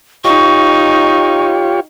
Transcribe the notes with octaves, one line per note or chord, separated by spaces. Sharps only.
D#4 F4 G4 C#5 C#6